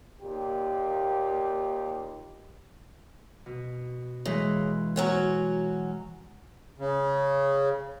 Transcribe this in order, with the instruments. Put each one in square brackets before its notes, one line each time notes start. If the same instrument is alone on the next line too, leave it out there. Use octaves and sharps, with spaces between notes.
[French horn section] D#2 A#2 G4
[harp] B2
[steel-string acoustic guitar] C#3 [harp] E3 G#3 B4
[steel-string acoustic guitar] F#3 C#4 F#4
[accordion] C#3